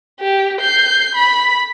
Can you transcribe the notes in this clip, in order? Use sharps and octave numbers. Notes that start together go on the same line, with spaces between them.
G4
G6 C7
B5 B6